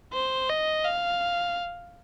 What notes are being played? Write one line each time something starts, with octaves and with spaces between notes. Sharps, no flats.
C5
D#5
F5